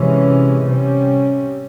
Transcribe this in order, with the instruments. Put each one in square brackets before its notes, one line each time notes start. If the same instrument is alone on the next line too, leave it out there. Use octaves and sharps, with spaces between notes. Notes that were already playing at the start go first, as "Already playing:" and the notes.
Already playing: [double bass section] C3 E3 G#3 C#4
C3 G3 C#4